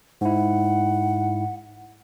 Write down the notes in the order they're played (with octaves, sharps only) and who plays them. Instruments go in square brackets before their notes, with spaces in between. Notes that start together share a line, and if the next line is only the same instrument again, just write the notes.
[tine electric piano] G#2 E4 [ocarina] F#5